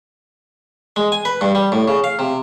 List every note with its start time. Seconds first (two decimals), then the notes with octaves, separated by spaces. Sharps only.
0.96 G#3
1.12 G#5
1.25 B4
1.41 G2
1.55 G3
1.72 A2
1.88 C#3
2.04 F5
2.19 C3